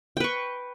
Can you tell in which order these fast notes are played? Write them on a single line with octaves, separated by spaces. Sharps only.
G5 B4 C#6